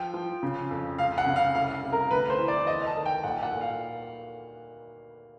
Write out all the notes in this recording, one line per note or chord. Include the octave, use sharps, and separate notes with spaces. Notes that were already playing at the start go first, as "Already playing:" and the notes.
Already playing: F3 G5
F3
C#3
F2
C#2 F5
F#5
C#3
F5
C2 F5
C3
A#4
D2 B4
C5
E3
D5
E2 D#5
A5
D#3
G5
A#2 F#5
F#5
A#2
F5